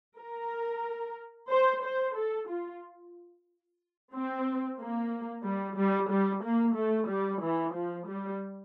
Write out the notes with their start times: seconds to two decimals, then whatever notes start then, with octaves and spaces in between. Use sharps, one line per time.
0.19 A#4
1.51 C5
1.84 C5
2.16 A4
2.49 F4
4.13 C4
4.79 A#3
5.44 G3
5.78 G3
6.11 G3
6.44 A#3
6.76 A3
7.09 G3
7.43 E3
7.75 F3
8.08 G3